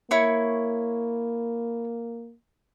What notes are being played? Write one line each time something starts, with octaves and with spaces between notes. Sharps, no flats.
A#3 E4 C#5 C#6